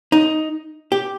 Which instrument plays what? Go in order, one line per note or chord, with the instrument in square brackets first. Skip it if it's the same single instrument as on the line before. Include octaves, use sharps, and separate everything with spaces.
[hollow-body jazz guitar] D#4
G4